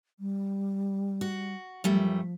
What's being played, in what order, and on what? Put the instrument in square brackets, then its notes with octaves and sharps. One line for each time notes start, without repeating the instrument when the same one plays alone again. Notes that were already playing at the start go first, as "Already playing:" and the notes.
[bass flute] G3
[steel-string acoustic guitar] F#4
[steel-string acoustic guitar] F#2 G3 A3 [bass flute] F3